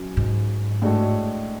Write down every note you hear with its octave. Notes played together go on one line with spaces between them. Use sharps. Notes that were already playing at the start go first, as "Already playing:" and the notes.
Already playing: F#3 C#4
G#2
A2 G#3 D4 F#4 A4